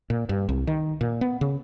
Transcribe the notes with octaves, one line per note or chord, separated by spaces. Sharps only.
A#2
G2
C2
D#3
A#2
B3
C#3